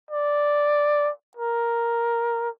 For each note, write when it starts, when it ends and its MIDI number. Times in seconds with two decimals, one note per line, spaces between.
0.11 1.11 74
1.37 2.49 70